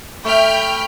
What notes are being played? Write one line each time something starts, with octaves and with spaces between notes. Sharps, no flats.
A3 G5 B5 F6